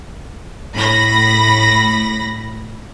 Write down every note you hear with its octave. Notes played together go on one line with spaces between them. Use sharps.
A2 B5 A#6